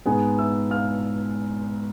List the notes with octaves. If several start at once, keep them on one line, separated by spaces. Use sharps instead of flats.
G#2 G#3 B3 G#4 G#5
E5 E6
F5 F6